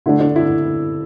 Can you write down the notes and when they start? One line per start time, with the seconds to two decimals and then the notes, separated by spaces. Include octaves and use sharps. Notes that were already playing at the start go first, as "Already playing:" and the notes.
0.06 D3 A3 D4 E4
0.20 D4
0.36 E4